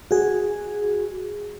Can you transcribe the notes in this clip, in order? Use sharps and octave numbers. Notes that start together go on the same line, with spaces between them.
F#4 G#4